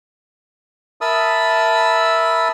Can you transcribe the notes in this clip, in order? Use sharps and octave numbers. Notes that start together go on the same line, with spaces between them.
A#4 E5 A5 B5 D#6 E6